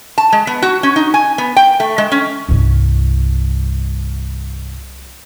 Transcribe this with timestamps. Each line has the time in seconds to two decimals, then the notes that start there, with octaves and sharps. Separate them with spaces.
0.18 A5
0.32 G#3
0.47 B3
0.62 F#4
0.83 C#4
0.96 D#4
1.14 G#5
1.38 B3
1.56 G5
1.80 A3
1.98 G#3
2.12 C#4
2.49 C2 G2